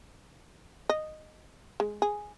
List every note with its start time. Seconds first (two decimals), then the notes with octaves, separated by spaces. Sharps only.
0.89 D#5
1.80 G#3
2.02 G#4